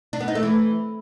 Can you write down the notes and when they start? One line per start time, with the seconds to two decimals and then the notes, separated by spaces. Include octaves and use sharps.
0.13 D4
0.20 B3
0.28 D#4
0.35 A3
0.43 E3